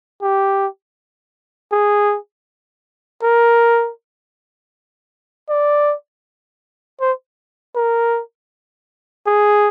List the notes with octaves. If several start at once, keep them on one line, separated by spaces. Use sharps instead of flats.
G4
G#4
A#4
D5
C5
A#4
G#4